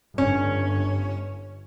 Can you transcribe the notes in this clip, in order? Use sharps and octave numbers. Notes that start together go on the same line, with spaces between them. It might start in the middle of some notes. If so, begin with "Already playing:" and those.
G1 C#4